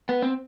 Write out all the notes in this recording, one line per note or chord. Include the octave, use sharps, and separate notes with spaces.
B3
C4